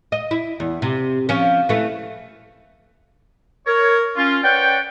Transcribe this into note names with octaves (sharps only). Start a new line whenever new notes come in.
D#5
E4
E2
C3
F3 C#4
E3 A3
A#4 C#5
C#4 F4
B4 C#5 D5 F#5 G5